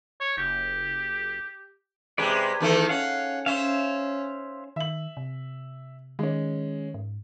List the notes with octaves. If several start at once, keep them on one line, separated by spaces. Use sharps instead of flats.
C#5
F#1 G4
C3 G#3 G4 B4 D5
E2 D#3 A3
C#4 F5 F#5
C#4 C5 E5 F5
D#3 E5 F#7
C3
D#3 G#3 C#4
G#2